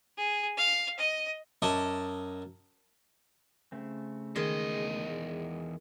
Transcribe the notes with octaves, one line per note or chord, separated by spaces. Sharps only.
G#4
F5
D#5
F#2 D#5 E5 A5 D6
C#3 A3 C4
E2 D#3 G#3 D#5